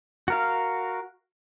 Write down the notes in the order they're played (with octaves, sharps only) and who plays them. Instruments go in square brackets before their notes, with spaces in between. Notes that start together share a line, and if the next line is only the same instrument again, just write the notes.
[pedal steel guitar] F#4 A#4 F5